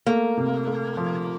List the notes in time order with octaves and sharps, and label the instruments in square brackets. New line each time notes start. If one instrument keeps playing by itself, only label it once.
[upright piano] A3 [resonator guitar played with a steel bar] A#3
[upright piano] C3
A3
F3